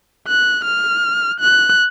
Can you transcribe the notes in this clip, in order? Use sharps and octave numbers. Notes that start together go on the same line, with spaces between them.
F#6
F6
F#6